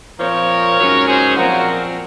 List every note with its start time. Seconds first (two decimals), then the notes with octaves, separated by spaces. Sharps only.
0.19 A#2 F3 C4 A#4 C#5
0.78 G#2 F#3 C#4
1.07 G#4 C5
1.36 A#2 F3 C4 F#4 A#4